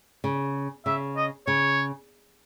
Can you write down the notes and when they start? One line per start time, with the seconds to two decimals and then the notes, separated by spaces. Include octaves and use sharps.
0.24 C#3
0.86 C#3 E5
1.16 D#5
1.47 C#3 C#5